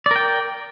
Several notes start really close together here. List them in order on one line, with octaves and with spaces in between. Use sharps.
D5 A#4 G5